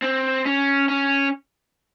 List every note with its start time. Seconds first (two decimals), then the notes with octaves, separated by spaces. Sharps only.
0.02 C4
0.46 C#4
0.89 C#4